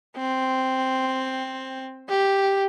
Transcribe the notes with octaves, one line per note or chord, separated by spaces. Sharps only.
C4
G4